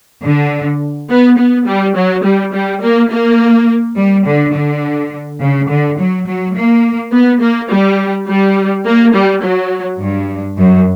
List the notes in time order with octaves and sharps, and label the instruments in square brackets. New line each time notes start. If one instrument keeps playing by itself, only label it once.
[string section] D3
B3
B3
G3
F#3
G3
G3
A#3
A#3
G3
D3
D3
C#3
D3
F#3
F#3
A#3
B3
A#3
G3
G3
A#3
G3
F#3
G2
F#2